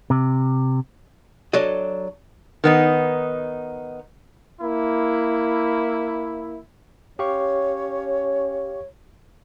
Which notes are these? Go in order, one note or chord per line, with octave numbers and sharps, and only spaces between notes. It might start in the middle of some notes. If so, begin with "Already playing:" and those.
C3
F#3 D4 A4 D#5
D#3 B3 D#4
A#3 E4
C#4 G4 C#5 F5 C#6